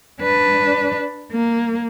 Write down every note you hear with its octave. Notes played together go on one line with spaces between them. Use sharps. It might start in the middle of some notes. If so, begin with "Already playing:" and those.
D4 B4
A#3